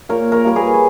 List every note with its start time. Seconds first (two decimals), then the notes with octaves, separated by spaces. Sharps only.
0.09 A#2 A#4 C#5
0.32 A#4 C#5
0.45 G3 A#3 A#4
0.56 G#4 B4
0.74 C#5